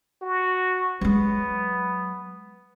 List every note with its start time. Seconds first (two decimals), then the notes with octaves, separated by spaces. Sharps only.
0.22 F#4
1.01 F#3 G#3 B3